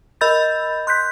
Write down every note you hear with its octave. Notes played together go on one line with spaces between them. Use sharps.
A#4 D#5 B5 E6 G6 A6
C6 F#6 G6 B6